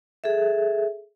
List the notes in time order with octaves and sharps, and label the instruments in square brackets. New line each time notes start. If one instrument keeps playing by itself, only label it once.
[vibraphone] G#4 A4 E5